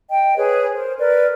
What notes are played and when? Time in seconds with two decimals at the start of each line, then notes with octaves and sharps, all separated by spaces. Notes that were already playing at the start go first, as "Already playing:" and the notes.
0.10 D#5 G5
0.37 G#4 B4 C#5
0.74 A#4 C5
0.98 A#4 B4 D5